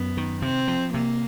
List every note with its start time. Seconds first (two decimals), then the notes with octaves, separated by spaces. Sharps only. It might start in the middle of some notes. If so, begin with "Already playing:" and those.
Already playing: F#2 B3
0.17 D#3
0.42 C3 C4
0.68 F3
0.93 C3 A#3